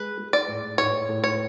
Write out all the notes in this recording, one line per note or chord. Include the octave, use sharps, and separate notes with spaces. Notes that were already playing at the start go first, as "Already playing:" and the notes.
Already playing: G#3 B4
G#3
D5
A2
A2 C#5
A2
C#5